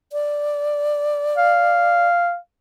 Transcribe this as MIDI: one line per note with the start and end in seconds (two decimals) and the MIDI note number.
0.12 2.07 74
1.37 2.36 77